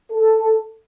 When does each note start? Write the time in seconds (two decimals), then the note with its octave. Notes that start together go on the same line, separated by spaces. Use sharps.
0.11 A4